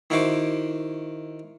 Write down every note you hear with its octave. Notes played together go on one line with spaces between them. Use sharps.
D#3 E4 F#4 C5 D6